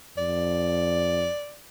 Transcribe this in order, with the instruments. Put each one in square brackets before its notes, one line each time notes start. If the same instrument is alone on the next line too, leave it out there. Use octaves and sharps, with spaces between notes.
[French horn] F2 [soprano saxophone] D5